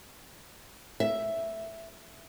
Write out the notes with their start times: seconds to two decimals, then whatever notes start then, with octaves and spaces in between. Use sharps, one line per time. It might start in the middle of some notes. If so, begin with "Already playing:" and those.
1.00 E5